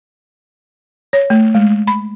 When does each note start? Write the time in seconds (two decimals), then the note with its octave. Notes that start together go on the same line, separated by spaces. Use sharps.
1.13 C#5
1.30 A3
1.55 G#3
1.87 B5